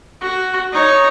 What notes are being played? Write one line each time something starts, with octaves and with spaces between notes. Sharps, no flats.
F#4
D#4 C#5